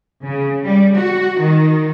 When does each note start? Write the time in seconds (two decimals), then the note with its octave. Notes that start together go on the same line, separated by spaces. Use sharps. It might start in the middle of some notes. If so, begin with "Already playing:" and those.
0.25 C#3
0.64 G3
0.97 F#4
1.38 D#3